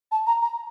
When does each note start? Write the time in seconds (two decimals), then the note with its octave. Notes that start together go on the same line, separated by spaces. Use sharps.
0.12 A5
0.27 A#5
0.42 A#5